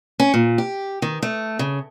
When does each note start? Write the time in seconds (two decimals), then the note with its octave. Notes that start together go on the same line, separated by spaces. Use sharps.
0.20 C#4
0.34 A#2
0.58 G4
1.02 D#3
1.22 A3
1.59 C#3